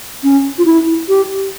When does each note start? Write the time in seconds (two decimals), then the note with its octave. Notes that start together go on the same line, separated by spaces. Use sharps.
0.24 C#4
0.58 F4
0.65 E4
1.09 G4